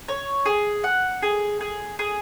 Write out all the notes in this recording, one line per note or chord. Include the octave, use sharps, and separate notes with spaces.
C#5
G#4
F#5
G#4
G#4
G#4